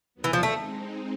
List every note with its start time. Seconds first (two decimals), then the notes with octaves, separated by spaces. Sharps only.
0.14 D#2 D#3 F#3 B3
0.24 E3
0.33 F3
0.43 G#3 A3 C4 D#4